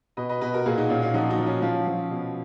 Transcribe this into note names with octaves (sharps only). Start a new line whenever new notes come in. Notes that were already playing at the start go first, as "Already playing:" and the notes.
B2 B4 D#5
B4 D#5
B2 B4 D#5
F#4 A#4
A#2 F4 G#4
D#4 F#4
A#2 C#4 F4
C#4 F4
F3 D#4 F#4
D#4 F#4
F3
C#4 F4
F3 C#4 F4
F3
B2